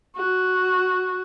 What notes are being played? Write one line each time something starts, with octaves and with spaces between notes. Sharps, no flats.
F#4